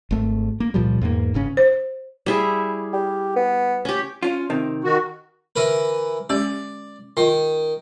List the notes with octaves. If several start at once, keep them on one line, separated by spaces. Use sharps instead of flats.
G#1 A3
A#3
C#2 A#2 F3 G3
E2 G#2 A#3
G1 C#3 C#4
C5
G3 E4 G#4
G4
B3
C#4 G4
C#4 F4
C3 D#3
D#3 F#4
D3 E3 A#4 B4
G#3 C#4 G4 D5
D#3 F4